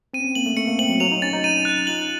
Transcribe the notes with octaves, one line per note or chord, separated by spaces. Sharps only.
C4 D#7
C#4
C4
A#3 F#7
A3
A3 C#7
A#3
C4 F#7
F#3
F#3 F7
D#4
C#4 A6
D#4
D#4 D#7
F#6
F4 F#7